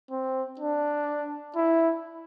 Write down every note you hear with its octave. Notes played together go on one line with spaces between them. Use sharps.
C4
D4
E4